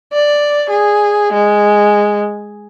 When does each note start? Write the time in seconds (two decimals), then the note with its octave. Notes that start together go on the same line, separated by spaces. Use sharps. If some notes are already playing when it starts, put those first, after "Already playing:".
0.13 D5
0.70 G#4
1.33 G#3